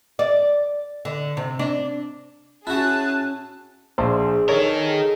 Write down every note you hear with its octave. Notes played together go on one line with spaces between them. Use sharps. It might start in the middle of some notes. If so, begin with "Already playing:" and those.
D5
D3
C3
D4
C#4 E4 F#4 G#4 A5 F#6
A#1 G#4 C5 E5
D#4 A4 A#4 C#5